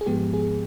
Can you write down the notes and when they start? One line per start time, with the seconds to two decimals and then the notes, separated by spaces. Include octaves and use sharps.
0.01 G#4
0.06 G#2 F3 G#3 B3 G4
0.33 G#4